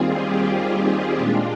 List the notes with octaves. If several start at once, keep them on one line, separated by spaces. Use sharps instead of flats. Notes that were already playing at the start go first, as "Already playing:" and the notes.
Already playing: D#2 D#3 G3 C4 F4 G#4
G4
A#2 G#3 D4 F4